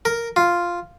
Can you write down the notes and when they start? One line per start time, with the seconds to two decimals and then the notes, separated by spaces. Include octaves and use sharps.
0.05 A#4
0.36 F4